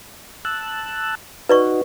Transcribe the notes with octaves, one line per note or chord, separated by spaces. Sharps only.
A5 E6 F#6
D#4 F#4 B4 D5 C#6